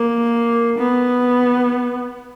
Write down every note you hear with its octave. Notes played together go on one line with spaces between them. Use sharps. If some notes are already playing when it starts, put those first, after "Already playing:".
Already playing: A#3
B3